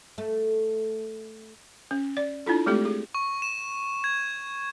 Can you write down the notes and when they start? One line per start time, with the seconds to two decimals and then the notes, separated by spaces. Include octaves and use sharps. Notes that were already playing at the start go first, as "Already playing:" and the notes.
0.18 A3
1.91 C#4
2.17 D5
2.46 D4 E4 F4 A4
2.66 G#3 A3 C4 G4 A4
2.85 G#4
3.15 C#6
3.42 E7
4.04 G#6